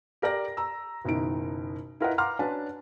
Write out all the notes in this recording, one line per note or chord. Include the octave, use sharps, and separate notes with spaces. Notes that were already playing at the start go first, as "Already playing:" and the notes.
G4 A#4 D5 A#6
A#5 E6
F#1 B2 D#3 D#4 E4 D7
E4 F4 A#4 B4 D#5 F#5
F5 F#5 A#5 C6 D6 F6
C#4 D4 F#4 B4 A5